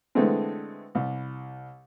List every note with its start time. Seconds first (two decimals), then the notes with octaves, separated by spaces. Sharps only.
0.15 D3 E3 G#3 A3 B3 C4
0.95 C2